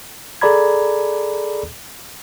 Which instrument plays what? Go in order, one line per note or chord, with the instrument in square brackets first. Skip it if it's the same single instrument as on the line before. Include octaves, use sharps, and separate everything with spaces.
[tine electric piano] G#4 A4 D5 A#5 B5 G#6